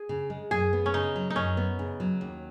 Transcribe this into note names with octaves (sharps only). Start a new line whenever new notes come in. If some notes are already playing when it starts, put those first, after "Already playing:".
Already playing: G#4
C#3
G#3
F#2 G#4
B3
C#4
C#3 D#4
F#3
D#4
F#2 C#4
B3
C#3
F#3
D#2